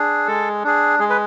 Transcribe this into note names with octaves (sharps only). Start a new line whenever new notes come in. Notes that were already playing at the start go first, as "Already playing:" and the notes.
Already playing: D4 G#4
G#3 A4
D4 G#4
G#3 G#4
B4